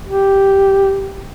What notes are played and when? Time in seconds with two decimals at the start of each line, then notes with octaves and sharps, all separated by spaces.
0.07 G4